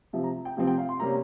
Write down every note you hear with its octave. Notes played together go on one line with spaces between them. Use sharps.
C3 F3 C4 E5
A#5
G5
C3 F3 C4
G5
F5
C6
C3 G3 A#3 C#4 A#5